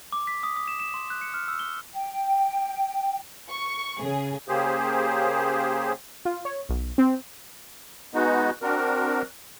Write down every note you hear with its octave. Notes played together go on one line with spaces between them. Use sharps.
D6
B6
D#6
D#6
E7
E7
C6
F#6
C#7
F6
E6
G7
G5
C#6
C#3 G#4
C#3 A#3 G4 G#4 C5
F4
C#5
B1
C4
G#3 B3 D#4 F#4
C4 D4 F#4 A#4